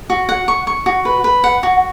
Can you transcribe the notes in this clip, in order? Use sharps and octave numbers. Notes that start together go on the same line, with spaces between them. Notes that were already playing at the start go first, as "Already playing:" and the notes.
F#4
F#5
C#6
C#6
F#4
B4
B4
F#5
F#4